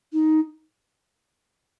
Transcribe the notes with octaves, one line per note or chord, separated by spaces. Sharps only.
D#4